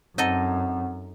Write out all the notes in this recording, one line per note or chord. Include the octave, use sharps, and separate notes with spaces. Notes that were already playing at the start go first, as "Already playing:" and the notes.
F#2 C4 D#4 A4 D#5 F#5